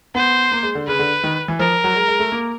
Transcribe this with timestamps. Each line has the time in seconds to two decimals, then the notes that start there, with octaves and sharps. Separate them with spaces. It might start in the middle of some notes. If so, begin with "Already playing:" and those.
0.15 B3 C5
0.52 A#3
0.63 G#3
0.75 D3
0.87 C#3 B4
0.99 D3
1.24 D#3
1.48 E3
1.59 F3 A#4
1.84 F#3
1.96 G#3
2.08 G#3
2.19 A3
2.32 A#3